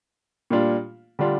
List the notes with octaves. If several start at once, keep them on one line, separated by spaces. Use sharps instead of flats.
A#2 G3 D4 F4
D3 G3 D4 F4